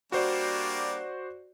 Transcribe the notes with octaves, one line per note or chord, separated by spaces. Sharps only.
G3 A#3 D4 F#4 C5 D5